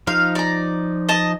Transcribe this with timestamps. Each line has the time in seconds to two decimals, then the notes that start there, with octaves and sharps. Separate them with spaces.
0.07 F3 D#4 F5
0.35 D5 A#5
1.09 D#5 A5